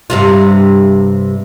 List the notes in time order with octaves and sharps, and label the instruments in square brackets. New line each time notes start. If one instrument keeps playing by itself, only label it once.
[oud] G2 C3 F4